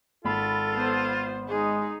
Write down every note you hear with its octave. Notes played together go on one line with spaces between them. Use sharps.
G#1 F4 A4 B5
B3 C5
G#3 D#4 G#4